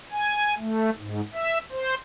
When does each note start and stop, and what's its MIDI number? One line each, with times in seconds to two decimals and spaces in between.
0.12 0.54 80
0.58 0.90 57
0.95 1.21 44
1.34 1.58 76
1.72 1.95 72